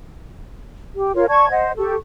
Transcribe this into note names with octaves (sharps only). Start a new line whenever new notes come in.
G4
F4 A#4 C#5 F5
D5 A5 C#6 G#6
C5 D#5 F#5
G4 A4 C#6